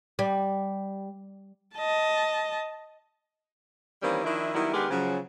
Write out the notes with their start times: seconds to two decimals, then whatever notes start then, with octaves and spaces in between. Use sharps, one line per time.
0.19 G3
1.76 D#5 A5
4.02 D#3 E3 G3 A#3 C4 C#4
4.24 D#3 F3 D4 E4
4.54 D#3 F#3 G3 B3 E4
4.73 D#3 G#3 B3 D4 G4 A#4
4.89 C#3 F3 F#3